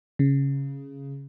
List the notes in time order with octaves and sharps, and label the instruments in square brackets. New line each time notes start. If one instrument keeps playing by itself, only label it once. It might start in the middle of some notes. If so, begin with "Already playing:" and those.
[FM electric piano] C#3